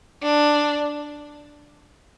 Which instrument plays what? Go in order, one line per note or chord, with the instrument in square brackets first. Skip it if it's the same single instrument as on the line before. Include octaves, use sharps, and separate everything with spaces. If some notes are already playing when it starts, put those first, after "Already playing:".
[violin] D4